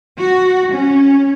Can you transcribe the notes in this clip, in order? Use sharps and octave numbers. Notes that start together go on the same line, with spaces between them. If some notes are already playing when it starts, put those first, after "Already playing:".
F#4
C#4